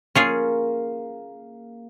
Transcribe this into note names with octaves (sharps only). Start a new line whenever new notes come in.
A#3 C#4 F4 G#4